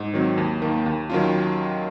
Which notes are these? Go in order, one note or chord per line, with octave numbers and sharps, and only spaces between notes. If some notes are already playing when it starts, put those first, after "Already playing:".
Already playing: G#2
D#3 F#3 C4
D#2
D#3 A#3
D#2
D#3 F#3 C#4 F4